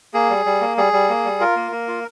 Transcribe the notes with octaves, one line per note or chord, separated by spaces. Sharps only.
A#3 G#4
G3
G3
A#3
G3 G#4
G3
A#3
G3
F4 A#4
A#3
A#3
F4